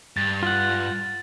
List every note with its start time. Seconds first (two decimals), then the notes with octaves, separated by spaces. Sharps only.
0.17 G2 A6
0.43 F4 F#5